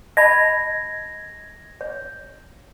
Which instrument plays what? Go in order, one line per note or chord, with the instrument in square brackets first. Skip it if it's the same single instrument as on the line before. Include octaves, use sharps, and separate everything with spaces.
[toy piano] D#5 A5 B5 [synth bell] G#6 A#6
[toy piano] C#5